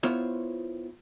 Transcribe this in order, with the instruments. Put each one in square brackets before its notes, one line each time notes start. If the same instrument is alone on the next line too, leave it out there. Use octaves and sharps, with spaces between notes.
[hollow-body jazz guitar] B3 E4 F4 C5 C#5